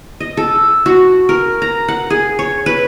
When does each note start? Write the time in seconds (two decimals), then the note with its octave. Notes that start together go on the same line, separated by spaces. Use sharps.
0.20 D#5
0.37 A4
0.86 F#4
1.29 A#4
1.62 A#5
1.88 F#5
2.10 G#4
2.39 C#5
2.66 B4